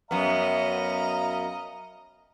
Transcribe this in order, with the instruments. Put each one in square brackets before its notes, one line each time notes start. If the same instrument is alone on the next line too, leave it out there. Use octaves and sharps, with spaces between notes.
[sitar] F#2 B3 [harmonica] D#5 F5 A#5